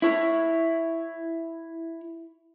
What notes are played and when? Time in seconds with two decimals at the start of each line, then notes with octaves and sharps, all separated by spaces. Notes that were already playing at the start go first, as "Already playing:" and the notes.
0.02 E4 C#5